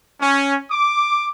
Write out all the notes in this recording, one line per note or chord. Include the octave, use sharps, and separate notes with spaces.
C#4
D6